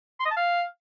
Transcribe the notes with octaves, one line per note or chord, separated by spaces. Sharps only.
C6
D#5
A5
F5